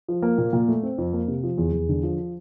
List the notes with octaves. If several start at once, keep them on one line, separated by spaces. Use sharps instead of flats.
F3
A#3
A#2
A#2
A3
C4
F2
A#3
C3
F3
E2
E2
D3
F3